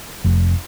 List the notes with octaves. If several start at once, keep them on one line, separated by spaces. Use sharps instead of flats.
F1